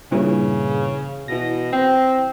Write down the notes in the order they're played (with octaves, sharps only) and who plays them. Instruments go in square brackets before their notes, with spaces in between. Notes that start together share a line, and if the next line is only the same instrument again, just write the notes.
[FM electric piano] G2 A#2 E3 [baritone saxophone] C#3
[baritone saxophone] B2 [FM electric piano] E3 A#6
[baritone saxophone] C4